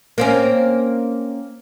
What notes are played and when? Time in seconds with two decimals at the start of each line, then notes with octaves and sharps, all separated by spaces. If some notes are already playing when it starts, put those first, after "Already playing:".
0.18 A#3 C4 C#4